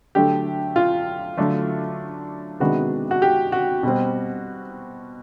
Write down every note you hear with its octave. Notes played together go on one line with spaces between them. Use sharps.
D3 F#3 A3 D4 G4
F4
D3 F#3 A3 D4
C3 D#3 G#3 B3 D4 F#4
F#4
G4
F#4
B2 G3 C4